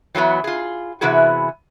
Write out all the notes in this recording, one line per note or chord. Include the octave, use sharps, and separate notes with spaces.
E3 F#3 A#3 B3
F4 G#4
C3 E3 B3 E4 F#4 G#4